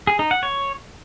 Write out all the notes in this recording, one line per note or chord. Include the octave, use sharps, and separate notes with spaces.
G#4
D#4
F#5
C#5